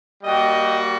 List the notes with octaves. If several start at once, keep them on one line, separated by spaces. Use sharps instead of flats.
G3 A#3 F#4 D#5 G5